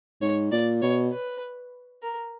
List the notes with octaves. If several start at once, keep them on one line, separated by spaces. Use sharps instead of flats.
G#2 C#5
A#2 D5
B2 C#5
B4
A#4